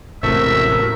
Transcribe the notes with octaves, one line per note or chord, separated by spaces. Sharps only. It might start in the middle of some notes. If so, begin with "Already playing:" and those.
E1 A1 C3 A3 E4 F#4 A#4 E5